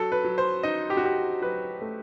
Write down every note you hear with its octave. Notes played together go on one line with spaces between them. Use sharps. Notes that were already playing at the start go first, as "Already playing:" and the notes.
Already playing: F#3 A4
B4
F#3
C5
D#4 D#5
G4
F#4
D#4 G4
F#3 B4
A3